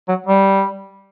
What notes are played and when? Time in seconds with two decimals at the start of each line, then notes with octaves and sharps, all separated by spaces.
0.08 F#3
0.27 G3